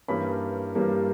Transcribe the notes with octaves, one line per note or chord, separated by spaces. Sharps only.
G2 E3 G3 A#3 C#4 B5
G2 E3 G3 A#3 C#4